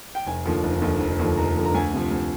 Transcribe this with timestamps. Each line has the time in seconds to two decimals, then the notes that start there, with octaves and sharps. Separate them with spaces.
0.15 G5
0.26 F1 G#5
0.45 D#2 D3 F3
0.63 F1
0.82 D#2 D3 F3
1.00 F1
1.19 D#2 D3 F3
1.37 F1 A#5
1.56 D#2 D3 F3
1.65 A#5
1.74 D2 G#5
1.93 C3 F3
2.11 D2